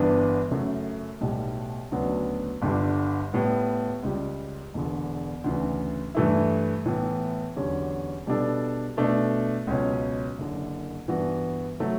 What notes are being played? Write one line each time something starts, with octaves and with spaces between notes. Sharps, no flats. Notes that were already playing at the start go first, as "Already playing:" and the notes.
Already playing: G1 G2 E3 B3 D4
F#2 C#3 F#3 A3
B1 A2 G3
D2 C#3 F#3 B3 D4
G1 G2 D3 G3
A2 G3 B3
C#2 C#3 G3
E1 E2 D3
D2 C#3 E3
G2 E3 A3 E4
A2 E3 B3
E2 D3 F#3 C#4 G4
B2 G3 D4 A4
B2 A3 D4
C#2 B2 F#3 C#4
F#1 F#2 D3
G2 E3 B3 F#4
F#3 A3 E4